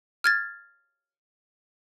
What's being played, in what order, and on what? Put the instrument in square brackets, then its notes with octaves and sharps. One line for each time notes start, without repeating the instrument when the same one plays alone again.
[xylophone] F6 G#6 A6